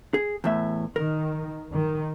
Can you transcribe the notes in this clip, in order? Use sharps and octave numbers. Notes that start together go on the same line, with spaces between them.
G#4
E2 A2 E5
D#3 A#4
D#3